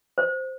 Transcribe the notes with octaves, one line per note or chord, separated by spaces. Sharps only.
C5